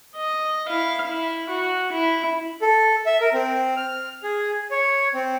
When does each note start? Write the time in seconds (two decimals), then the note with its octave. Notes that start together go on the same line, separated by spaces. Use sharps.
0.16 D#5
0.68 E4 F5
1.07 E4
1.49 F#4
1.92 E4
2.62 A4
3.06 E5
3.21 A#4
3.33 C4
3.77 F6
4.23 G#4
4.71 C#5
5.14 C4